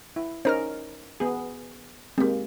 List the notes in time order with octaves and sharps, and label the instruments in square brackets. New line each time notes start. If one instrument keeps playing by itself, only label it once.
[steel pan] E4
[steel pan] C#4 D#4 A#4 [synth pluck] C5 A#5 F6
[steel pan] B3 G#4
[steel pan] G#3 A#3 [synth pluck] C4 G4